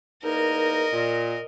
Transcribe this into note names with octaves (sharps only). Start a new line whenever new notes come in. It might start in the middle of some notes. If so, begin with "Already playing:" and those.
E2 A#3 D#4 A#4 D#5
A#2